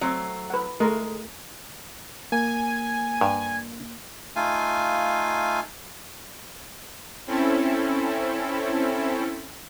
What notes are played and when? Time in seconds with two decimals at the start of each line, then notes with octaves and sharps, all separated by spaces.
0.01 F#3 A3 C4
0.50 B4 F#5
0.80 G#3 A3 A#4
2.32 A#3 G#5
3.21 G2
4.36 A3 D#4 F4 F5 G#5
7.27 C4 C#4 E4 A4